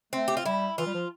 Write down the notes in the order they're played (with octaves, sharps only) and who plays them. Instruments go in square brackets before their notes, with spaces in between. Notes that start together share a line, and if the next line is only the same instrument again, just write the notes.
[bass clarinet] A3 [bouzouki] C4
[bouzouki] G4
F4
[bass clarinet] G3 [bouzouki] E4
[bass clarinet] E3 [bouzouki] F4
[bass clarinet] G3
F3